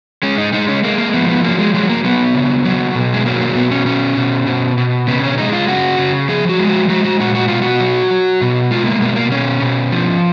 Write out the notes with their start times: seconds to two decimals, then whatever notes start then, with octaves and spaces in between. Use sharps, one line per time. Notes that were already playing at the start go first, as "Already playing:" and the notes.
0.23 G#3 C#4
0.38 D#4
0.53 G#3 D#4
0.68 C#4
0.84 G#3 A#3
0.98 A#3
1.14 F3 B3
1.29 B3
1.44 F#3 A#3
1.59 G#3
1.74 F#3 G#3
1.89 A#3
2.04 F#3 B3
2.35 C#3
2.65 F#3
2.95 B2
3.14 G#3
3.26 F#3 A#3
3.41 A#3
3.56 B2 B3
3.71 C#4
3.86 B2 C#4
4.17 B2
4.47 B2
4.78 B2
5.07 C#3 B3
5.23 C#4
5.38 G#3 D#4
5.53 F4
5.68 C#3 F#4
5.98 C#3
6.28 F3 G#4
6.49 F#4
6.59 G#3
6.69 F#4
6.89 G#3 F#4
7.05 F#4
7.20 A#2 F#4
7.35 F#4
7.48 B2 F4
7.62 F#4
7.80 F#3
8.11 F#3
8.41 B2
8.71 G#3 F4
8.86 A#3
9.01 B2 A#3
9.16 A#3
9.32 B2 C#4
9.62 B2
9.92 F3